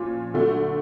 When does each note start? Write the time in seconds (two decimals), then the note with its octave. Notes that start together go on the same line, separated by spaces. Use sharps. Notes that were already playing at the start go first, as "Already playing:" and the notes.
Already playing: A#2 F3 C#4 F4
0.34 D3 F#3 A3